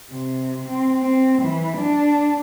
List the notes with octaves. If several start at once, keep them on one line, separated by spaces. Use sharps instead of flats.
C3
C4
C4
E3
D4